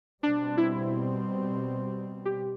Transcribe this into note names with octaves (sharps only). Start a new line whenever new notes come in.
B2 G3 C4 D4
E4
G4